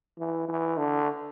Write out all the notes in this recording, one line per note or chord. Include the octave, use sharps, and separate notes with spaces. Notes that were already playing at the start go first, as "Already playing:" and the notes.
E3
E3
D3